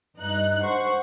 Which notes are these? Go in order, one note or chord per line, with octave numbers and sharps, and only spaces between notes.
G2 D#4 F#6
C5 F#5 C#6